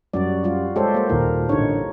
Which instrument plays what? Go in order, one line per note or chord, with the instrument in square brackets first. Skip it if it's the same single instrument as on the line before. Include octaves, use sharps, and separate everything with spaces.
[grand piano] F#2 [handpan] G3 F#4 D5
[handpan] G3 F4 F#4
[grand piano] G#3 C#5 [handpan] G4 A4 C5
[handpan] A#3 C5
[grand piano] D#2 A#2 [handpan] A#4
[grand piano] A1 D3 [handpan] D#4 C#5